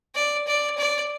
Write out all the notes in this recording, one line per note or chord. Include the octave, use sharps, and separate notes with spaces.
D5
D5
D5